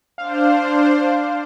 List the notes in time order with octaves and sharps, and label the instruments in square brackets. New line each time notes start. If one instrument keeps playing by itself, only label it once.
[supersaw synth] D4 C5 [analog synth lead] F5